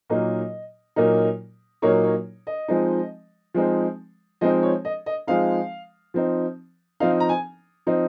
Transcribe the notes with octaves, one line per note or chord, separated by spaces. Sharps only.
A#2 F#3 A#3 D#4 D#5
A#2 F#3 A#3 D#4
A#2 F#3 A#3 D#4 C#5
C#5
D#5
F3 G#3 C4 D#4
F3 G#3 C4 D#4
F3 G#3 C4 D#4 D#5
C#5
D#5
D#5
F3 G#3 C4 D#4 F5
F3 C4 D#4
F3 C4 D#4 F5
A#5
G#5
F3 C4 D#4